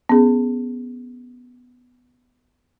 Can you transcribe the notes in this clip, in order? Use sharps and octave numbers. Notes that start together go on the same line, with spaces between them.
B3 C#4 G#4